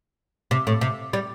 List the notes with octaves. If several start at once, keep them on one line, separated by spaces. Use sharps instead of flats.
C3
A2
C3
G3